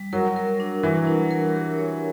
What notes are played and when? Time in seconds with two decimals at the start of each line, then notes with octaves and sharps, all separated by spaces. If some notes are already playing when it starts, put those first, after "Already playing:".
Already playing: G3
0.13 F#3 A#4
0.36 A#4
0.60 D4
0.83 E3 A#4
1.07 D4
1.31 A#4
1.54 G4
1.78 C#5